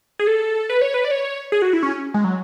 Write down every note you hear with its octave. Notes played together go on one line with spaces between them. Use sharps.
G#4
A4
B4
C#5
B4
D5
C#5
C#5
G#4
F#4
E4
C#4
G#3
F#3